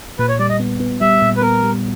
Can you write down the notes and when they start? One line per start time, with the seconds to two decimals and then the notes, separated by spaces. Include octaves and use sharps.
0.19 A#2 B4
0.29 C#5
0.39 G3 D5
0.49 D#5
0.60 B3
0.80 B3
1.01 G3 E5
1.22 A#2
1.37 B4
1.42 B3 A#4
1.63 G3